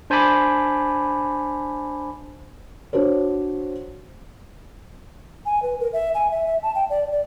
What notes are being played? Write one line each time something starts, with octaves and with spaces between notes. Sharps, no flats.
D4 C5 G#5 A5 B5 D6
D4 F#4 C5 C#5
G#5
B4
A#4
E5
G#5
E5
E5
A5
G5
D5
D5